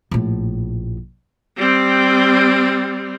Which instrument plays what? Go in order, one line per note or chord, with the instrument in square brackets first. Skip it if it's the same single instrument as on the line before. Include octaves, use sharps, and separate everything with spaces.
[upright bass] A#1 A2
[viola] G3 C4